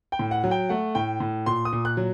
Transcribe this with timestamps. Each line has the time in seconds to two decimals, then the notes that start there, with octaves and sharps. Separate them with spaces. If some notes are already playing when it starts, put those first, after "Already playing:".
0.12 G5
0.19 A2
0.31 F#5
0.44 F#3
0.51 G5
0.69 A3 F#5
0.95 A2 G5
1.20 A2
1.46 A#2 C6
1.65 D#6
1.73 A#2
1.85 F#6
1.97 F#3